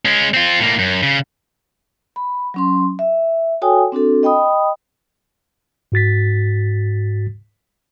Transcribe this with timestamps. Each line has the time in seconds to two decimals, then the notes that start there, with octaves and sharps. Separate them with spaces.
0.05 G#3 C#4
0.34 C4 F4
0.60 A2 A#3
0.79 F#2
1.03 C#3
2.16 B5
2.54 F#3 C#4 C6
2.99 E5
3.62 F#4 A4 C#5 G5 G#5 D#6
3.92 C4 D4 F#4 A4
4.23 D#5 G5 B5 D#6
5.92 G#2 F#4 A6 B6